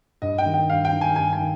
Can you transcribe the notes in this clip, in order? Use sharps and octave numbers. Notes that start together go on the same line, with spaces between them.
G2 D#5
G5
D#3
G5
G2 F5
G5
D#3
G#5
G2 G#5
G#5
D#3